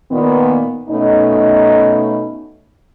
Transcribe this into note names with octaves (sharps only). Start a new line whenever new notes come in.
A#2 D#3 B3
B2 A3 C#4 D#4